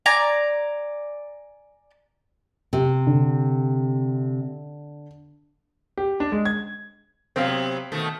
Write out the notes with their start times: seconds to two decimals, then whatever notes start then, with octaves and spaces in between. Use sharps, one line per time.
0.06 D5 G#5 A#5
2.73 C3
3.07 D3
5.98 G4
6.20 D4
6.32 G#3
6.45 G#6
7.36 C3 F#3 B3 C4 F5
7.92 B2 D#3 A3